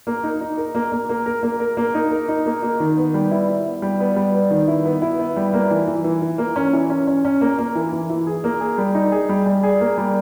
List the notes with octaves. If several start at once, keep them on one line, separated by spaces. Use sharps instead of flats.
A#3
D#4
D#4
A#4
A#3
A#3
A#3
A#4
A#3
A#4
A#3
D#4
A#4
D#4
A#3
A#3
D#3
B3
G3
E4
E4
B3
G3
B3
G3
B3
D#3
E4
B3
E4
B3
G3
A#3
E3
E3
E3
E3
A#3
C#4
E3
C#4
C#4
C#4
A#3
A#3
E3
E3
E3
G#4
A#3
G#4
G3
D#4
G#4
G3
G3
G#4
A#3
G3